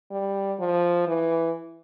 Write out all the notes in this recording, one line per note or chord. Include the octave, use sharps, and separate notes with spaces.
G3
F3
E3